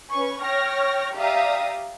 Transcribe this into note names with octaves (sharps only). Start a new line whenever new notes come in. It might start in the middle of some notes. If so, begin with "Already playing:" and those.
C#4 B4 G#5 C#6
C#5 G5 C#6 F6 A#6
G4 D5 E5 F5 A#5 D#6